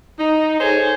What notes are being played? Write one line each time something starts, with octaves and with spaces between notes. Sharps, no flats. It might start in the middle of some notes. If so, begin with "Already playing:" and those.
D#4
G#4 A4 C5 C#5 G#5